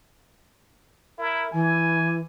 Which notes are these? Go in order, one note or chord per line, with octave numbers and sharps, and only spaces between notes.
E4 A#4
E3 G#5